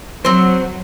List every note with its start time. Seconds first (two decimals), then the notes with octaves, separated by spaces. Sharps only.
0.25 F#3 C4 C5